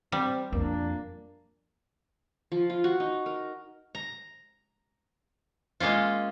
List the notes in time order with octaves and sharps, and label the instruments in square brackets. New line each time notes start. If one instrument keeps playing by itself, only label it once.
[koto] G3 [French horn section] C4
[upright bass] F2 [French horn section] A#2 A#3 [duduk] D4
[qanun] F3
F4
F#4
D#4
A#4
[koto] A#5
G#3 A#3 C#4 F4